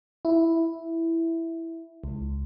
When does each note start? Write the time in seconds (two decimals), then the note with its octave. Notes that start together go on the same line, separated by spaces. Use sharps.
0.25 E4
2.04 C#2